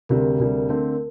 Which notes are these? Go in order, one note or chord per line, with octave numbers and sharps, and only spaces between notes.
D2 C3 G3 A#4
D2 C3 G3
D3 A3 C4